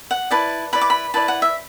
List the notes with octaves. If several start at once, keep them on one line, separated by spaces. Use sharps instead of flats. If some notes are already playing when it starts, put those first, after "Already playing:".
F#5
E4 B4 D5 A5
E4 B4 D5 B5
D6
B5
E4 B4 D5 A5
F#5
E5